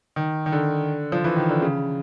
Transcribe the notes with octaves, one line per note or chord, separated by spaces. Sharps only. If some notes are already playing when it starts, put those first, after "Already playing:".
D#3
D#3
D3
F3
E3
D#3
D3
C#3